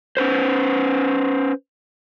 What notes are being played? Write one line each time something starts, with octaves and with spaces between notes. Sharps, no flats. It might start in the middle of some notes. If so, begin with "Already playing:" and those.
C#4 B4 C5